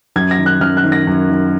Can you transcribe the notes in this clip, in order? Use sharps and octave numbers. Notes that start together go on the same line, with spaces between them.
F#2 G#6
A#6
D#3
F#6
F#2 F6
F#6
D#3
A#6
F#2
D#3